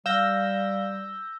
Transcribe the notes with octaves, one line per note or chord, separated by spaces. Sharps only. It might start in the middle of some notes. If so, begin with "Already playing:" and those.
G3 F5 E6 G6 A#6